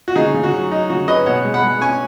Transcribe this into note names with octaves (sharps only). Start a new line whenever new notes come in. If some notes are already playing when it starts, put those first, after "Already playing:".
F#4
C#3 D#4 G#4
C#3
F#4
F#3
F#3 D#4
C#3 F#4
C#4 B4 D#5
B2 C#5 F#5
G#3
F#5 B5
G#3
C#4 G#5 C#6